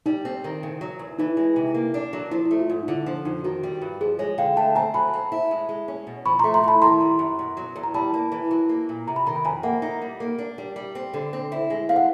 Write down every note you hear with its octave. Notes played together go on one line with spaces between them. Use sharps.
G3 D#4
C4
D#3
C#3
F#3
E2
E3 D#4
G#3
C3
A#3
D4
F#3
F3 E4
E4
A3
F4
G#2
D#4
D3 E4
F3 D4
F2 D#4
D#3 F#4
G3
G2
F3 G#4
G#3 C#5
D3 F5 G5
A3 G5 A5
C4 G#5 A#5
F#3 A5 B5
C4
E4
G#3
G#3
C#4
B2
F3 B5 C#6
A3 A#5 C6
A#5 C6
A2 A5 B5
D#3 A#5 C6
G3
F#2
B2
F#3
E2
A#5
G3 A5 B5
A#3
E3
F#3
A#3
A#2
C3 A#5
B5
D#3 A#5
B5
F2 G#5 A#5
G5
A#3 E5 F#5
D#4
G3
A#3
D4
G3
G3
C4
D3
C4
E4
G#3
C4 F5
F#5